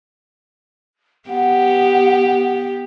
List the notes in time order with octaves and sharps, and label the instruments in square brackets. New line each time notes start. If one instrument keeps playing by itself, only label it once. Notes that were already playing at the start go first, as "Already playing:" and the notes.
[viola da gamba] B3 G4 [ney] F#5